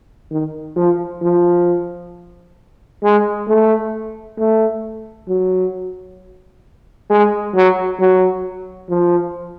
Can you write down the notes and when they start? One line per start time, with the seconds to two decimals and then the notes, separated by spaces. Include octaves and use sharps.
0.31 D#3
0.76 F3
1.22 F3
3.03 G#3
3.48 A3
4.39 A3
5.28 F#3
7.10 G#3
7.55 F#3
8.00 F#3
8.90 F3